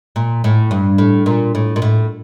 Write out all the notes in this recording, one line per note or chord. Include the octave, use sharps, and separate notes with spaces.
A#2
A2
G2
A2
A#2
A2
A#2
A2